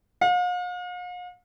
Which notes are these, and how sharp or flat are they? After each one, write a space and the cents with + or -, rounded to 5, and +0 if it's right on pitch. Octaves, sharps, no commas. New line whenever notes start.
F5 +45